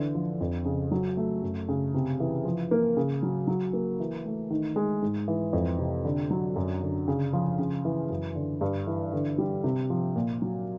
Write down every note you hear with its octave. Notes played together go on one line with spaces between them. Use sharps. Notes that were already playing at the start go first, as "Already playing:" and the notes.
Already playing: D3 E3
F3
F2
C#3
F#3
A3
F#2
C#3
C3
E3
F3
A#3
C#3
F#3
F#3
A#3
E3
A3
D#3
G#3
G#2
E3
F2
C3
D3
F#3
F#2
D3
C#3
F3
C#3
E3
F#2
D3
G2
E3
D3
G3
C3
F3
A#2
F#3